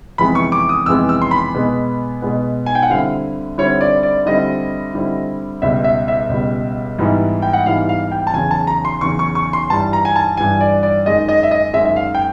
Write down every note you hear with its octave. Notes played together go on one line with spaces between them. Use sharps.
F2 C3 E3 G#3 B3 B5
C#6
D6
D#6
F2 C3 E3 G#3 B3 E6
E6
C6
B5
B2 G#3 B3
B2 G#3 B3
G#5
G5
F#5
D3 G3 C4 E4 F5
D3 G3 C4 E4 C#5
D5
D5
D3 G3 C4 E4 D#5
D3 G3 C4 E4
C#2 B2 G3 E5
E5
E5
C#2 B2 G3
G#2 E3 G3 B3 E4
G5
F#5
G#2 E3 G3 B3 E4 F5
F5
G5
A5
E2 C#3 F#3 G#5
A5
A#5
C6
E2 C#3 F#3 C#6
C#6
C#6
C6
G2 E3 G3 A5
A#5
G#5
A5
G2 E3 G3 G#5
D5
D5
F#2 D#3 G#3 D#5
D#5
E5
D#5
F#2 D#3 G#3 E5
E5
F5
G5